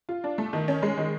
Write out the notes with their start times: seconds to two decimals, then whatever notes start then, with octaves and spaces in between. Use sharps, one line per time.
0.09 F4
0.24 D4
0.38 A3
0.53 D#3
0.68 C#4
0.83 G#3
0.97 D#3